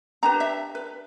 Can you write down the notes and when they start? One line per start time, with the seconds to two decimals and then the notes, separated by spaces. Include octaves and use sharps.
0.23 D4 G4 B4 A#5
0.40 E5
0.75 B4